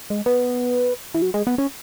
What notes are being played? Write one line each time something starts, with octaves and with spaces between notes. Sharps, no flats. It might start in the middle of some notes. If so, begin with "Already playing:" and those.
G#3
B3
E3
F#3
G#3
B3
C#4